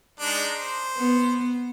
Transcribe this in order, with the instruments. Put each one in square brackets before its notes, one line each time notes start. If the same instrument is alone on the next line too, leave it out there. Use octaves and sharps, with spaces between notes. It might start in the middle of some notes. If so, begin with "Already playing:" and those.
[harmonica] G#3 D4 D#4
C5
[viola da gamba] B3